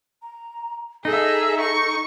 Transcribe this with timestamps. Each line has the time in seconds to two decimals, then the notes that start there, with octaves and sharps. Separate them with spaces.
0.22 A#5
1.05 D#4 G#4 A4 E5
1.60 C#6